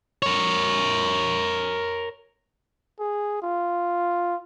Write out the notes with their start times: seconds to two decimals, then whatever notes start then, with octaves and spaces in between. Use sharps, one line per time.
0.22 A#4 C#5
3.00 G#4
3.42 F4